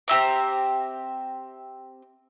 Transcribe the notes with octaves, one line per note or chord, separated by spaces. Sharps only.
C4 G4 E5 A#5